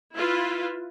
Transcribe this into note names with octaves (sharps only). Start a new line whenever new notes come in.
E4 F4 B4